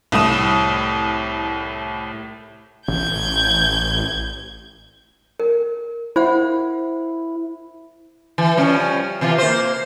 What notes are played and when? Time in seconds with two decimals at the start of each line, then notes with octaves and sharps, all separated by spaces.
0.12 C2 A2 D#6 E7
2.88 A1 G6 G#6
5.40 A#4
6.16 E4 C5 F5 F#5
8.38 E3
8.57 F3 G3 C#4
9.21 C3 E3 F4
9.38 A#3 C5